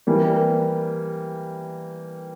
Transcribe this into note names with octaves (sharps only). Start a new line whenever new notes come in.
E3 G3 A#3